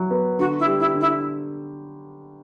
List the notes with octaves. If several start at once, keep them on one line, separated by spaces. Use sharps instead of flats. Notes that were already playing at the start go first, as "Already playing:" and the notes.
Already playing: F#3 E4
B3
D3 F#4
E4
G3
E4
D3
E4